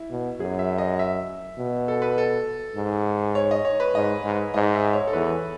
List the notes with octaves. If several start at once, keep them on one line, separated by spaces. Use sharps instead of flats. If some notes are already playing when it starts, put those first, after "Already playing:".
Already playing: E4
B2
F#2 G#4
E5
D#5
E5
B2
A4
B4
A4
G#2
C#5
D#5
C#5
B4
G#2 D#5
G#2
G#2 D#5
E5
C#5
A4
E2 B4